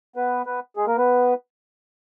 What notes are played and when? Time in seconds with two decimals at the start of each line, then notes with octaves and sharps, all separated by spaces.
0.16 B3 B4
0.46 B3 B4
0.76 G#3 G#4
0.87 A#3 A#4
0.97 B3 B4